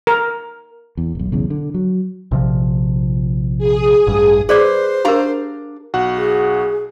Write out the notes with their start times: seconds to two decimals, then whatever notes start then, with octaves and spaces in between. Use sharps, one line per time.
0.07 A#4
0.97 E2
1.15 E1 B1
1.32 B1 E2 C#3
1.50 D3
1.74 F#3
2.31 A#1 C3 F3
3.58 G#4 D#6
4.07 A1 G2
4.49 G#4 B4 C5 D5 D6
5.05 D4 G4 A#4 F5 A#5
5.94 B1 F#4 F#5
6.16 G#4